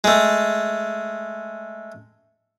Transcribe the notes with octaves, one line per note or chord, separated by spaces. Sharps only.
G#3 A3